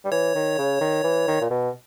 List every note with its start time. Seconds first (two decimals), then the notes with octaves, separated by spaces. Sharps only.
0.05 G3
0.11 E3 C#5
0.35 D#3
0.58 C#3
0.81 D#3
1.04 E3
1.27 D#3
1.41 A#2
1.50 B2